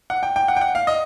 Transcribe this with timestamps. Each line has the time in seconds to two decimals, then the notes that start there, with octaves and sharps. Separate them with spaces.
0.10 F#5
0.23 G5
0.36 G5
0.48 F#5
0.56 G5
0.61 F#5
0.75 F5
0.87 D#5